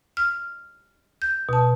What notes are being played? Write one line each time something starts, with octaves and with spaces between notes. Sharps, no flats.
F6
G6
B2 A5